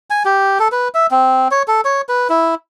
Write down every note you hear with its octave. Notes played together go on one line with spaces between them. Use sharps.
G#5
G4
A4
B4
E5
C4
C#5
A4
C#5
B4
E4